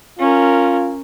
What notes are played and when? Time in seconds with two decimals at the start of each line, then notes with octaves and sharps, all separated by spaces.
0.19 C#4 F4 A#4